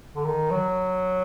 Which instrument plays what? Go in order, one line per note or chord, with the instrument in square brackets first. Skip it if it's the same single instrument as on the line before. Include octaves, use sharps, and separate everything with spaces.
[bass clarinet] D3
D#3
F#3